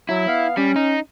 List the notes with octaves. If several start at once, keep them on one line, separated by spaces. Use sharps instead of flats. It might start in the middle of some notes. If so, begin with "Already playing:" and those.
F#3 E4
B3 F5
G3 C#4
D#4